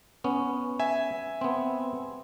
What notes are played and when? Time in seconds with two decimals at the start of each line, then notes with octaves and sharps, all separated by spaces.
0.24 B3 C#4
0.80 E5 G#5
1.41 B3 C4